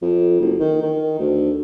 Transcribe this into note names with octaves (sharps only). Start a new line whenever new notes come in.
F2
F#1
D#3
D#3
D2